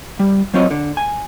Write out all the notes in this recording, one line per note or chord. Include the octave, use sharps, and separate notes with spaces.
G3
F#3 C4 F4 C#5 D#5
D3
G#5